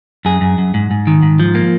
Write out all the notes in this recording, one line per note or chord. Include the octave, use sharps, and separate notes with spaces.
F#2 G#4
F#2
F#2
G#2
G#2
D#3
G#2
F3
A#3